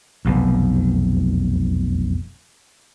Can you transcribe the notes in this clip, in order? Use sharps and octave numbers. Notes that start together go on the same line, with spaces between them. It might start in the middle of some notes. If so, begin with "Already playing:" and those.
F1 B1 E2